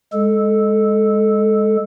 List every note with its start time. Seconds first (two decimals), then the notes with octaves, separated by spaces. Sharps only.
0.13 G#3 A4